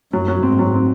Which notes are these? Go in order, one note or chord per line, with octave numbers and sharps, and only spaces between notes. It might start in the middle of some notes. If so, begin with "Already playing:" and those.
F#2 F#3
F#3
G#2 C4
F#3
C4